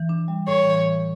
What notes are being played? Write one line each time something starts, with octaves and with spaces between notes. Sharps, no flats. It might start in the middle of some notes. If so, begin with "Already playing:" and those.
Already playing: E3
D4
G3
A2 C#5
E3
E3